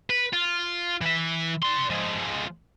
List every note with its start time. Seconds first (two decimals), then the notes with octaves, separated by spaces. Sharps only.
0.10 B4
0.33 F4
1.01 E3 E5
1.62 D5 C6
1.90 F3 G#3